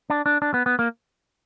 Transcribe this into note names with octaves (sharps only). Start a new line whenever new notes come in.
D4
D4
D4
B3
B3
A#3